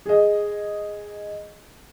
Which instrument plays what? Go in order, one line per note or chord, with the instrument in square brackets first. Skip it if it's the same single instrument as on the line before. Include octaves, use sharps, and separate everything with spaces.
[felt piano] G#4 D#5